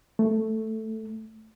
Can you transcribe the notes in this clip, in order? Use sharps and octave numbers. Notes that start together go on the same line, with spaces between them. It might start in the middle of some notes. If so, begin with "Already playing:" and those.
A3